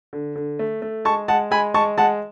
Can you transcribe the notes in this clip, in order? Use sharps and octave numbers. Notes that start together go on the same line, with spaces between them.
D3
D3
A3
A3
G#3 A5 C#6
G#3 F#5 A5
G#3 G#5 B5
G#3 A5 C#6
G#3 F#5 A5